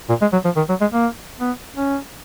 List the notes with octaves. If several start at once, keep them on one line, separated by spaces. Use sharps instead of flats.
A#2
G#3
F#3
F3
D#3
F#3
G#3
A#3
B3
C#4